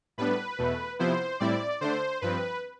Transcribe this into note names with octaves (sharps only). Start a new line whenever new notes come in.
A2 G3 B3 D4 B4
E2 B2 A3
C3 F3 B3 E4 C5
A2 G3 C4 E4 D5
D3 A3 D4 C5
G2 F3 C4 B4